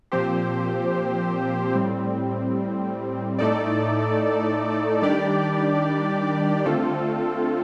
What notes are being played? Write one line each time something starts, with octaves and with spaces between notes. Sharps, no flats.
A#2 F3 C4 G4 C5
A2 G3 C4
A2 A3 D#4 A4 D5
D#3 G3 D4 G4 D5
D3 A3 C4 F4 A4